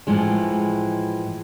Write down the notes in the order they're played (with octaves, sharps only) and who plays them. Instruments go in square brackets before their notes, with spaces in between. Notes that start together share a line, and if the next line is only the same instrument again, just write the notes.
[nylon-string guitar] A2 E3 F3 G#3